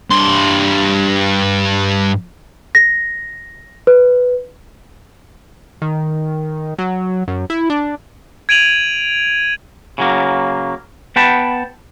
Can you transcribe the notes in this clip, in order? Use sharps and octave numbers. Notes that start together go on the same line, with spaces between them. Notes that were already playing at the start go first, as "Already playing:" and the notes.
G2 C6
A#6
B4
D#3
F#3
F#2
E4
D4
G#6 D7 D#7 F7 F#7
C#3 F#3 A#3
B3 F#5 G5 A5 B5